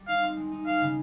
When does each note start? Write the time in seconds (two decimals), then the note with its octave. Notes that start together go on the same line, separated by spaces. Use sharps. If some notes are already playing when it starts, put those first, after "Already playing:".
Already playing: G3
0.08 D#4 F5
0.23 C4
0.37 G#3
0.52 D#4
0.66 G#3 F5
0.81 C#3